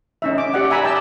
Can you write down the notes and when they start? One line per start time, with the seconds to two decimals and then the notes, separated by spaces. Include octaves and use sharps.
0.22 C#4 D#4 E5
0.38 D6
0.54 G4 D5 F#5
0.70 E5 G#5 A#5 B5
0.84 D5 G5 A5 E6